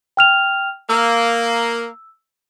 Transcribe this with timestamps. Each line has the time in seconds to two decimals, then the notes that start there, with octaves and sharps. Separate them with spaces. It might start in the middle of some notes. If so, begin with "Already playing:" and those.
0.17 G5 F6 F7
0.89 A#3 E6